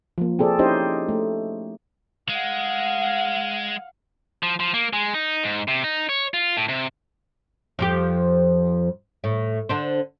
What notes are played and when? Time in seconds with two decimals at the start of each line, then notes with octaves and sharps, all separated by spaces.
0.18 F3 A#3
0.39 C4 G#4 A4 D5
0.59 C#4 D#4 E4 G4 C5 D#5
1.09 A3
2.29 G#3 F5 F#5
4.43 F3
4.60 F3
4.74 A#3
4.93 G#3
5.14 D#4
5.43 G#2
5.68 C3
5.84 D#4
6.09 C#5
6.34 F4
6.57 A2
6.69 C3
7.79 F2 F3 G4
9.24 A2
9.69 D3 D4 C5